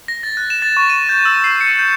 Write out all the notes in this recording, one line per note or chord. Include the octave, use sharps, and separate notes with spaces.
A#6
A6
F#6
E7
A6
C#6
D#7
G6
E6
C7
C#7
G6